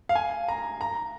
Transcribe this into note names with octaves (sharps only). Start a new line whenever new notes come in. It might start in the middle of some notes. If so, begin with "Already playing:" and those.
F5
G#5
A#5
A#5